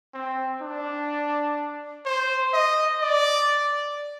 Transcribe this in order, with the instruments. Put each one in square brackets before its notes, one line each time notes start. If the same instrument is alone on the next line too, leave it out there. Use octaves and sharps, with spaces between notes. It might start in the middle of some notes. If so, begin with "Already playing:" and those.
[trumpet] C4
D4
C5
D#5
D5